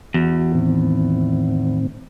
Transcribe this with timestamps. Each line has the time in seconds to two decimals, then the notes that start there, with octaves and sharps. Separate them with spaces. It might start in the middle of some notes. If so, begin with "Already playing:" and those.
0.14 E2 F#4
0.55 A2 D#3 C4